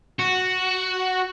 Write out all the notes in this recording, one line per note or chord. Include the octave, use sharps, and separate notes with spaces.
F#4